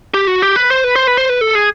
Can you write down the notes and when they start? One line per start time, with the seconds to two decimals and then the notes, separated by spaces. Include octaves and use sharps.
0.14 G4
0.27 F#4
0.42 G4
0.56 B4
0.70 C5
0.84 B4
0.96 C5
1.07 B4
1.17 C5
1.29 B4
1.41 A4
1.55 G#4